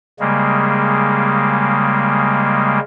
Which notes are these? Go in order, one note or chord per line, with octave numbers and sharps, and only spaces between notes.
C#3 G3 G#3 A#3